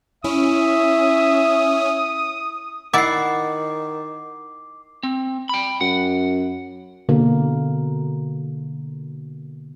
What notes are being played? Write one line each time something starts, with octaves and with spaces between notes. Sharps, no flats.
C#4 E4 E5 D#6
D#3 E4 D5 F#5 D6 C7
C4
G5 B5
F#2 F#5
B2 D3 A#3